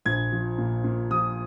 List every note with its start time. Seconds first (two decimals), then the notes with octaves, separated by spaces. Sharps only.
0.05 A#1 G#6
0.32 F3
0.58 A#2
0.84 A#2
1.10 F3 D#6